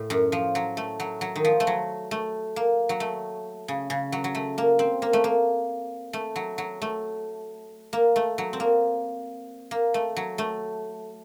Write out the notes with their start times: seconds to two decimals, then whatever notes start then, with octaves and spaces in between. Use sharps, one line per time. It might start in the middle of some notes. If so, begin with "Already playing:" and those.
Already playing: A2
0.10 F#2
0.32 F3
0.55 F#3
0.77 A3
1.00 F#3
1.21 F#3
1.36 D#3
1.45 F3
1.60 A3
1.67 F#3
2.11 A3
2.56 A#3
2.89 F#3
3.00 A3
3.68 C#3
3.90 C#3
4.12 F#3
4.24 F#3
4.35 A3
4.58 A#3
4.79 C4
5.02 A#3
5.13 A3
5.24 A#3
6.13 A3
6.36 F#3
6.58 F#3
6.82 A3
7.93 A#3
8.16 A3
8.38 F#3
8.53 C4
8.60 A#3
9.71 A#3
9.94 A3
10.16 F#3
10.38 A3